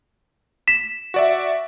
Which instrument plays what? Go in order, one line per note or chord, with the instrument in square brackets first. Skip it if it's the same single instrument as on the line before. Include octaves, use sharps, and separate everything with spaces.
[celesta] B6 E7
[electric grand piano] F#4 D5 E5